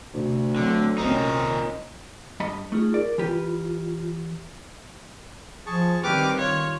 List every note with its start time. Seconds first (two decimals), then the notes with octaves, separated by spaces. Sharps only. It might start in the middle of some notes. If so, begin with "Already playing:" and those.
0.14 D2 C3
0.56 D3 F#3 A3 C4
0.98 C2 A#2 C4 C#4 D#4
2.40 G2 D#5 B5
2.72 A3 D#4 F4 G#4
2.94 A#4 D5
3.18 E3 F4 G4 B4
5.66 F3 G#4 A5 C#6
6.04 D#3 G3 C4 G4 B4 D6 F6
6.38 F4 C#5